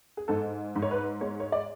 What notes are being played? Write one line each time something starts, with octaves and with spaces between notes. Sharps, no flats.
G#4
G#2 A4
G#2
C#5
B4
G#3 C#5
C#5
D5